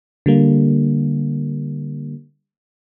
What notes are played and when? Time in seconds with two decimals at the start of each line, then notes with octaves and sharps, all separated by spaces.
0.26 D3 G3 A#3